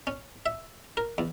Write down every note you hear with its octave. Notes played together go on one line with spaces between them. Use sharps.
C#4
E5
A#4
E2